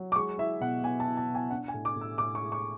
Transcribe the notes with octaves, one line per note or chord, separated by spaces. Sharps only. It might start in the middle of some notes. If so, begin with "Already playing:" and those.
Already playing: F#3
D6
G#3 C#6
E4 E5
B2 F#5
B3 G#5
A5
E4
A5
B2
G#5
D4 F#5
G#5
A2
D6
A2
E6
A2 D6
C#6
G#3
C#6